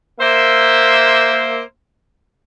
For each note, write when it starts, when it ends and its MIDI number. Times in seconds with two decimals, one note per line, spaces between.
0.20 1.61 58
0.20 1.61 72
0.20 1.61 76